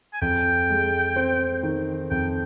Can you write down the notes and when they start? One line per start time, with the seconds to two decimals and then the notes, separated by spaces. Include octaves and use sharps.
0.13 G#5
0.21 F2 G5
0.70 G#3
1.16 C4
1.63 D#3
2.11 F2 G5